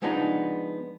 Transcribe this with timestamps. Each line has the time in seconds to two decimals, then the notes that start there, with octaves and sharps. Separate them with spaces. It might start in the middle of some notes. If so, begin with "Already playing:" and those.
0.02 F3 G#3 B3 D4 D#4